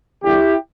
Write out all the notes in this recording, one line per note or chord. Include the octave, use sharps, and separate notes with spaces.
E2 D3 G3 E4 G4